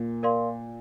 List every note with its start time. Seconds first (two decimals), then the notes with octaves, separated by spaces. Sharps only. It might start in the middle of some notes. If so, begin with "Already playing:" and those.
Already playing: A#2
0.23 A#4 D5 F5 C6